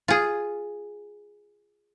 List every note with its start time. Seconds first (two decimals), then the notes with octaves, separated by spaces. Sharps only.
0.08 F4 G#4